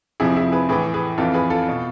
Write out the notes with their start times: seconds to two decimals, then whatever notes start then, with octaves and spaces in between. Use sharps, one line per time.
0.20 F2 C3 F3 E4 G#4
0.36 E4 G#4
0.52 G#4 B4
0.69 A2 E3 G#4 B4
0.94 G#4 B4
1.18 F2 E3 F4 A4
1.34 G#4 B4
1.50 F4 A4
1.69 B2